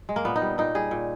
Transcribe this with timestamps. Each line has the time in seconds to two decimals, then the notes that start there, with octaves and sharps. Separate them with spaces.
0.09 G#3
0.16 A#3
0.25 A#2 B3
0.36 D#4
0.42 G3
0.58 A#2 D#4
0.75 G3 G#4
0.91 A#2